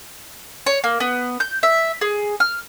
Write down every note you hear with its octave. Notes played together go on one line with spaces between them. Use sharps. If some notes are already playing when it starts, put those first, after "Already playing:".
C#5
A#3
B3
G6
E5
G#4
F6